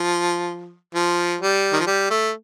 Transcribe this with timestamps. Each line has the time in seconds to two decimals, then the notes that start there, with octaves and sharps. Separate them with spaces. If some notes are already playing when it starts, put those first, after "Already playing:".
Already playing: F3
0.95 F3
1.41 G3
1.73 D#3
1.80 F3
1.87 G3
2.10 A3